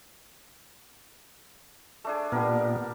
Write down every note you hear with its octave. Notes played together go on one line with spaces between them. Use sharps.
A3 D4 G#4
A#2 G3 B3 D4 A#4